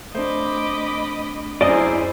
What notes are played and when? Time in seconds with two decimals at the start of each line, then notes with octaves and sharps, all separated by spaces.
0.15 A3 C4 D4 C5 D#5 B5 D6
1.61 F#2 E4 G#4 C5 D5 D#5